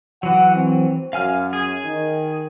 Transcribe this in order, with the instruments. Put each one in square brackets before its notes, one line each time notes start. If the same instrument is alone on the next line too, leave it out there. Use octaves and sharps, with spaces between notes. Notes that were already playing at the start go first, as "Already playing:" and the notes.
[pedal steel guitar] E3 F#3 [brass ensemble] F#5
[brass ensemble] C4
[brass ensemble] F#2 [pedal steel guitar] F5 G#5 F6
[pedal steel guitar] G#4
[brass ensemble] D#3